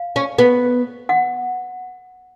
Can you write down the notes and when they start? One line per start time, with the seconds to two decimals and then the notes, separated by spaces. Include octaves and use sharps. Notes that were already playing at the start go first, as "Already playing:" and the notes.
Already playing: F5
0.16 C#4
0.38 B3
1.09 F#5